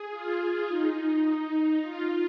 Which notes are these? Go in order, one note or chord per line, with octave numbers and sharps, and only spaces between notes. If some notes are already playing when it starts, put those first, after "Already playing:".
Already playing: G#4
F4
D#4
F4